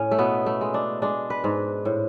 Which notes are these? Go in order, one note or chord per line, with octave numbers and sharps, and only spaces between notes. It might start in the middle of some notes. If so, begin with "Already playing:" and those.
Already playing: A2 C#4
A3
B2 B3
A3
G#3
D4
G#3 D4
B4
G#2
A2